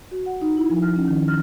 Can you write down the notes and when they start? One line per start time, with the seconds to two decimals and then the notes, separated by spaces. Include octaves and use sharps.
0.11 F#4
0.26 F#5
0.41 D#4
0.57 E4
0.70 F3
0.82 F6
0.96 C#4
1.08 D#3
1.28 F6